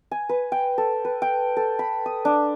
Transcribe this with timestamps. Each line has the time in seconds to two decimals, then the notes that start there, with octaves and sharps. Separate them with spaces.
0.11 G#5
0.29 B4
0.52 G5
0.78 A4
1.05 B4
1.22 G5
1.57 A4
1.79 B5
2.06 D#6
2.25 D4